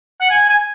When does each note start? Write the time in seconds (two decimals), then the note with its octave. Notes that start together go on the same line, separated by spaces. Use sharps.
0.21 F#5
0.30 G#5
0.49 G#5